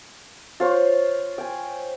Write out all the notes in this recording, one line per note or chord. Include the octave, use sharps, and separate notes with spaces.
F4 C5 C#5
G5 G#5